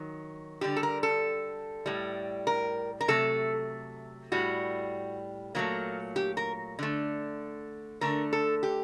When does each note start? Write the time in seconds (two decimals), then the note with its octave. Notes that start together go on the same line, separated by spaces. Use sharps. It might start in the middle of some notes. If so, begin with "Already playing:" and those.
Already playing: D#3 F#3
0.61 D3 G3 G4
0.76 A4
0.83 A#4
1.03 A4
1.86 A2 G3
2.47 A#4
3.01 A#4
3.08 C3 F#3 A3 A4
4.32 A2 G3 F#4
5.55 A#2 F#3 A3 A#3
6.16 G4
6.37 A#4
6.79 D3 A3
8.01 D3 A3 A#4
8.33 A4
8.63 G4